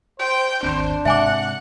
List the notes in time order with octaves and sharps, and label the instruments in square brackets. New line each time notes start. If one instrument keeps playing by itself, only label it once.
[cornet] C5 [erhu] G5
[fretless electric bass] G#1 D#2 C4 [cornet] D4 [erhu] C5
[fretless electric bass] G#2 C3 G#3 [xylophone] E5 G#5 D6 [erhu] F#5